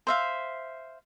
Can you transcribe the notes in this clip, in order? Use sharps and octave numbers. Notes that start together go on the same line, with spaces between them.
C5 E5 F5